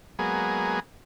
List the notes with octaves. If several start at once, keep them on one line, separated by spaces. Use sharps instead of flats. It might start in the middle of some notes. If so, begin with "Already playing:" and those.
F#3 G#3 A#3 B3 G#4